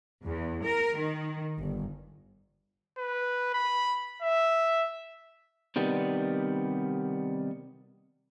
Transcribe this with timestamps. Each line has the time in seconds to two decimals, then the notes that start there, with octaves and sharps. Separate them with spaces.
0.25 E2
0.63 A#4
0.96 D#3
1.59 G1
2.98 B4
3.54 B5
4.22 E5
5.76 C3 D#3 G3 B3